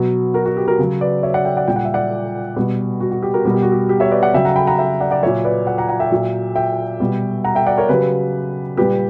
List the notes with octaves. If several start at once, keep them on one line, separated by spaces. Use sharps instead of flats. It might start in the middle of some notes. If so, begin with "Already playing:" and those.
Already playing: B2 F#3
F#4 A#4
F#4
G4
F#4 A#4
C#3 F#3
B4 D5
C#5 E5
D5 F#5
E5 G5
D5 F#5
A#2 G3 G5
F#5
E5
D5 F#5
B2 G3
F#4
F#4
G4
F#4 A#4
B2 G3 A#4
G4
F#4
G4
G4
C#5 E5
B4 D5
D5 F#5
C#3 F#3 E5 G5
F#5 A#5
G5 B5
F#5 A#5
E5 G5
D5 F#5
D5 F#5
A#2 F#3 C#5 E5
B4 D5
D5 F#5
F#5 A#5
F#5 A#5
E5 G5
A#2 F#3
E5 G5
B2 G3
F#5 A#5
E5 G5
D5 F#5
A#4 C#5
C#3 F#3 G4 B4
A#2 G3 G4 B4